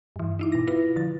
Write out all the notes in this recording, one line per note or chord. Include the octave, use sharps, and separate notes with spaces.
G2 E3
D#4 E4 D6
B2 A#6
E4 F4 B4 A#6
D3 F3 A6